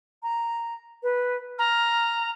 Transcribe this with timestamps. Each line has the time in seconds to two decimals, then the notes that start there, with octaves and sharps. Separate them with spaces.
0.23 A#5
1.03 B4
1.59 A#5 F6